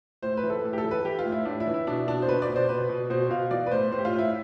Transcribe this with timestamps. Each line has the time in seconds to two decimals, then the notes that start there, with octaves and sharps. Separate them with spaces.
0.22 A2 C5
0.37 B4
0.44 E3
0.50 A4
0.64 A2
0.73 G4
0.78 A4
0.84 E3
0.91 B4
1.05 E3 G4
1.19 F4
1.25 A2
1.32 E4
1.45 A2 D4
1.60 E4
1.67 E3
1.74 E4
1.87 B2 D4
2.07 B2 D4
2.22 C5
2.27 B2 B4
2.42 D5
2.49 B2
2.56 C5
2.69 B2 B4
2.89 B2
3.10 B2 C5
3.30 B2 F5
3.51 E3 D5
3.66 B4
3.71 A2 C5
3.91 A2 C5
3.99 G4
4.05 F4
4.13 A2
4.18 E4